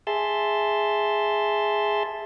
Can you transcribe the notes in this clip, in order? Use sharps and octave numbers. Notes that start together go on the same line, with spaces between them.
G#4 E5 A5 C6